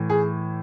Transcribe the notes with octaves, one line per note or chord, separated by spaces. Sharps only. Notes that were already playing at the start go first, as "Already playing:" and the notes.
Already playing: A2 E3
G#4